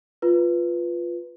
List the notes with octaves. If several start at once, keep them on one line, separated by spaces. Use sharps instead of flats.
F4 B4